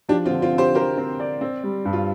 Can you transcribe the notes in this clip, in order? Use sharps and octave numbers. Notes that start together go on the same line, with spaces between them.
F3 D4 G4
C4 F4
D3
C4 F4
C4
G4 C5
G4 A#4 C5
C4
D5
C4
G3
G2
F4